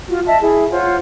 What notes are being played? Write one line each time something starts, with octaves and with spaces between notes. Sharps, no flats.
F4 F#4
D#5 E5 A5
E4 G#4
F4 C5 C#5 F#5